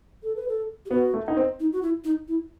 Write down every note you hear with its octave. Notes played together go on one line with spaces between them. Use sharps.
A4
B4
A4
G4
B3 F#4
A3
D#4
C4
D#4
F#4
E4
D#4
E4